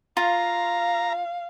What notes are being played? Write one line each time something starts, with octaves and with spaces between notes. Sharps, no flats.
F4 F5 A#5